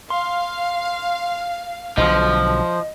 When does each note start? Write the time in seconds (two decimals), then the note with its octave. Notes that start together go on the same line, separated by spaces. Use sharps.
0.10 F5 C6
1.98 B1 B2 D3 F3 D#5